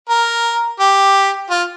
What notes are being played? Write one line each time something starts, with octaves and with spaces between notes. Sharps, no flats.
A#4
G4
F4